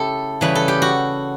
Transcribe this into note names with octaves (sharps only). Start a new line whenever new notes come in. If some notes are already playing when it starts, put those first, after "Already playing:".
Already playing: C#3 E4 G4 A4
C#3 E3 G3 B4
A4
G4
F#4